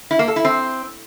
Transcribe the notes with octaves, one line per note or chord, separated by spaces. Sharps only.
E4
A#3
A4
E4
C4